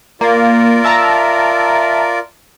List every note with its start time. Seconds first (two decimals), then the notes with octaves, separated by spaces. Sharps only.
0.21 A#3 F4 A#4 D5
0.84 E5 A5 A#5